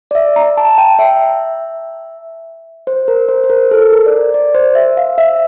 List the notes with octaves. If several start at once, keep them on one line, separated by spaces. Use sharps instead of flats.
D5
E5
A#5
A5
G5
E5
C5
A#4
C5
C5
A#4
A4
A#4
D5
D5
C5
E5
F5
E5